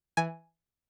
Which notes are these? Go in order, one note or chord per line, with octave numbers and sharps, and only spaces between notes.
E3 G#5